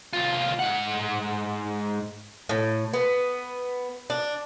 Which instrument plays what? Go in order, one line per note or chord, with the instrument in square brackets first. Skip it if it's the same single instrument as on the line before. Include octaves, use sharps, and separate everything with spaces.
[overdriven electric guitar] C2 F4
G#2 F#5
[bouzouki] A2
B3
D4